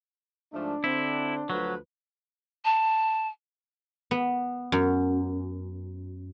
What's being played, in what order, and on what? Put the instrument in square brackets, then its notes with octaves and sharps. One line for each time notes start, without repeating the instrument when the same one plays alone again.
[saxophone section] G#2 F3 A3 [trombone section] D4
[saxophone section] D3 C4 [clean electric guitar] E4
[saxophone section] D2 F3 B4 [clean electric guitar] F#3
[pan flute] A5
[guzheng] B3
F#2